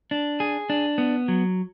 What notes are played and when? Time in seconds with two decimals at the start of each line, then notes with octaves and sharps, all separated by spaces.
0.11 D4
0.40 G#4
0.70 D4
0.98 B3
1.28 F#3